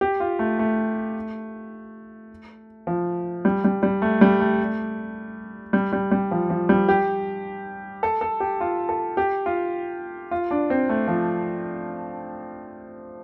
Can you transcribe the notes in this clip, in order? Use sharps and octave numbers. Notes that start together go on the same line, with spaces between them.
G4
F4
A3
A3
F3
G3
G3
G3
A3
G3
A3
G3
G3
G3
F3
F3
G3
G4
A4
A4
G4
F4
A4
G4
F4
F4
D4
C4
A3
F3